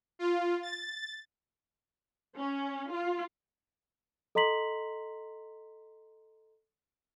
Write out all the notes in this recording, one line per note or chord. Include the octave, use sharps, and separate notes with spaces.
F4
A6
C#4
F4
A4 D#5 A#5 C6 B6 F#7